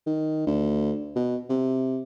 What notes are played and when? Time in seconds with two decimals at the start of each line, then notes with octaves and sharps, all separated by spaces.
0.07 D#3
0.47 D2
1.16 B2
1.49 C3